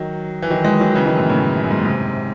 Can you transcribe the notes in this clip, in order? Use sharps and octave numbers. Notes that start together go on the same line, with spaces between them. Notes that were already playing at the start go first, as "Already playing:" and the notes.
Already playing: D#3 F#3
E3
D#3 F#3
E3 G#3
D#3 F#3
C#3 E3
D#3 F#3
F#2 A2
A2 C#3
F#2
G#2
A2
G#2 C3